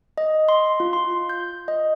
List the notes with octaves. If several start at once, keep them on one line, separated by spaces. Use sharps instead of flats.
D#5
C6
F4
C6
G6
D#5